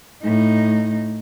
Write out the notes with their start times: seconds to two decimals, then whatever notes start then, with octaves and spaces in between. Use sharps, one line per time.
0.23 A2 D#4